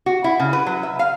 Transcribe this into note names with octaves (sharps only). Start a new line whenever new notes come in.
F#4
E4
C#3
B4
F#3
E5
F5